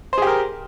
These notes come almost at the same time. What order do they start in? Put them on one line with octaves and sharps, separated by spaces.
C5 G#4 G4 A#4